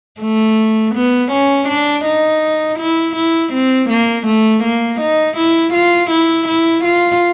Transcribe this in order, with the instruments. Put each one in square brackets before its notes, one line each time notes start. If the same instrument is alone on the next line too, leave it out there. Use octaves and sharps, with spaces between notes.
[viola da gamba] A3
B3
C#4
D4
D#4
E4
E4
C4
A#3
A3
A#3
D#4
E4
F4
E4
E4
F4